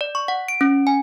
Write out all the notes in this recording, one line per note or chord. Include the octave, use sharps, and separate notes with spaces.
D5
C#6
F#5
D7
C#4
G#5